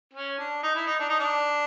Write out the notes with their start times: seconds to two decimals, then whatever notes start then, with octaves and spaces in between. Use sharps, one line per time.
0.14 C#4
0.38 D4
0.63 D#4
0.76 E4
0.87 D#4
1.00 D4
1.09 D#4
1.20 D4